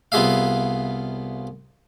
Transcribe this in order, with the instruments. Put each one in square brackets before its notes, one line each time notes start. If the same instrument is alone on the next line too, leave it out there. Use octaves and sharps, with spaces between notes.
[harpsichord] C2 B3 F4 G#4 E5 F5